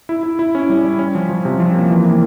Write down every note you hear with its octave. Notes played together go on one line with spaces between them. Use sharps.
E4
E4
E4
C#4
G3
G3
C#4
F3
F3
C3
F3
A#3
E3
A#3